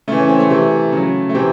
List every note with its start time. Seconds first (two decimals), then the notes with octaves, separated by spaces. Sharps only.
0.08 C#3 E3 A3
0.18 C#4
0.29 C4
0.39 A3
0.50 C3 E3
0.92 C#3 F#3
1.29 A3
1.35 C3 E3 C4